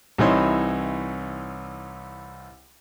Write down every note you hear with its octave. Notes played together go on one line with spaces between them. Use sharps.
C2 C3 E3 D#4 C#5 C6